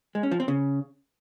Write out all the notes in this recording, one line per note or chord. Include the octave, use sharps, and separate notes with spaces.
G#3
C#4
F3
C4
C#3